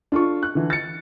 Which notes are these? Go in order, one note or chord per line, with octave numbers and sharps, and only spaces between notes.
D4 F4 A4 C#6
F#6
D3 E3
A6 C#7